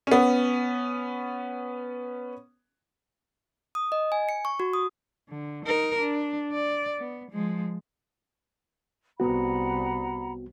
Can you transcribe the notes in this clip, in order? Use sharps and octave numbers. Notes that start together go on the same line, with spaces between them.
B3 C#4
D#6
D#5
G#5
C#7
C#6
F#4
D#6
D3
D#4 A#4
D4
D5
B3
F3 G#3
C2 B3 F#4 F#5 A#5 B5